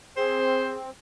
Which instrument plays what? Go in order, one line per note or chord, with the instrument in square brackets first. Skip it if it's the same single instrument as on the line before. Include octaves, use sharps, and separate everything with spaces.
[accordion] C4 [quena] G#4 [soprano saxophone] C5